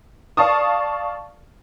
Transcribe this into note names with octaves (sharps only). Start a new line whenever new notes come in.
D5 F5 A5 C#6 D#6